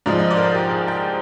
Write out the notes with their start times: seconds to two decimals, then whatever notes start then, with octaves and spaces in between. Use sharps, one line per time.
0.06 G#2 F3 G#3 D5
0.19 D#5
0.31 D5
0.37 A#4
0.43 C5
0.55 G4
0.71 G#4
0.88 G5